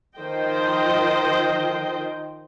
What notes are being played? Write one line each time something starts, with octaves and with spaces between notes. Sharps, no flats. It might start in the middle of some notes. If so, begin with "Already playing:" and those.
D#3 F3 C5 D#5 G5